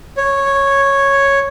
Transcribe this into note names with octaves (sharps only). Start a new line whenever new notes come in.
C#5